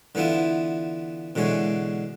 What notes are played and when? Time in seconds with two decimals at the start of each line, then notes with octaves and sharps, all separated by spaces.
0.15 D3 E3 B3 E4 F4
1.35 B2 D3 E3 G#3 C#5